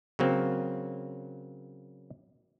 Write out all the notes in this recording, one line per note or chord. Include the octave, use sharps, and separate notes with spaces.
C#3 F#3 A#3 C4